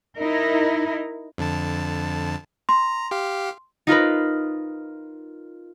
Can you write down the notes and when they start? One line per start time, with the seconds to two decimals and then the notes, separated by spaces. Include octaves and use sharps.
0.19 D#4 E4 A#4
1.38 F2 D3 A5
2.69 A#5 C6
3.11 G4 F5
3.87 D#4 F4 A#4 B4